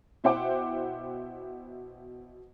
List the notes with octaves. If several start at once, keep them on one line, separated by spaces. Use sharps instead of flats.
B2 E4 C5 F#5 G5 D6